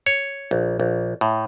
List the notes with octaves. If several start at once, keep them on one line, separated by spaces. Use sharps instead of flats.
C#5
A#1
A#1
A2